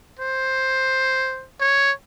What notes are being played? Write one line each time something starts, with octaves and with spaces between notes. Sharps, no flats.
C5
C#5